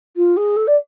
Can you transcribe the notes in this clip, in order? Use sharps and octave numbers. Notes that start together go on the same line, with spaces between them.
F4
G#4
A4
D5